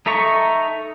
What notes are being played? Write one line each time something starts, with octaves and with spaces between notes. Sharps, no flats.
D#4 A4 E5 A#5 C#6